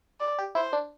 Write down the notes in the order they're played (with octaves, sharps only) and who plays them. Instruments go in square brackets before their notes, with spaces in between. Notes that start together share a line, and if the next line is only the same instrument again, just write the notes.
[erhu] D5
[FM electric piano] G4
[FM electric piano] E4 [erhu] C5
[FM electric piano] D4